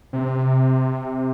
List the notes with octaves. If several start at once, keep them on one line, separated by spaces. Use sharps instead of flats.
C3